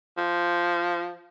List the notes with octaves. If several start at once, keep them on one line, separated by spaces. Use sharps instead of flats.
F3